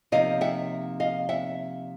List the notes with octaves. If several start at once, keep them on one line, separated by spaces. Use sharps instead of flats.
C3 F3 A#3 D#4 D#5 F5
E5 F#5
D#5 F5
E5 F#5